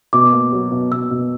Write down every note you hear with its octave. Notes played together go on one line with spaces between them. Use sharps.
B2 D6
A#3
F#3
B2
B2 E6
B2